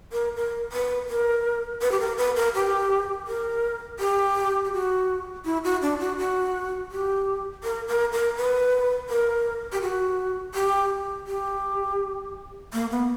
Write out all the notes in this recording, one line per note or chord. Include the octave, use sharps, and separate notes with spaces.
A#4
A#4
B4
A#4
B4
G4
A#4
B4
A#4
G4
A#4
G4
G4
F#4
E4
F#4
D4
F#4
F#4
G4
A#4
A#4
A#4
B4
A#4
G4
F#4
G4
G4
A#3
B3